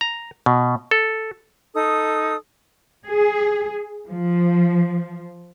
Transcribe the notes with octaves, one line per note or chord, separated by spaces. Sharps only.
A#5
B2
A4
D#4 A4 D#6
G#4
F3